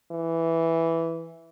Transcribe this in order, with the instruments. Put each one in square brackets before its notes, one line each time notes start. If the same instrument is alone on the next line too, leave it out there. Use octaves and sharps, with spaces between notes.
[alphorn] E3